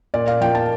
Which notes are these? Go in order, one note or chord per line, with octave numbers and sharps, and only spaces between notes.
A#2 D5
F5
F3 A#3 G5
A5